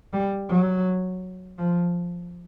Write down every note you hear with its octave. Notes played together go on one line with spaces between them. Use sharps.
G3
F#3
F3